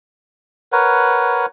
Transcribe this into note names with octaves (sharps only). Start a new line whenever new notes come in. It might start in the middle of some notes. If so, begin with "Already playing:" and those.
A#4 B4 C#5 F#5